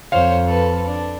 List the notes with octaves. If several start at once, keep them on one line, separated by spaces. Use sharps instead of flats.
F2 C5 C#5 F5
A4 B4
D4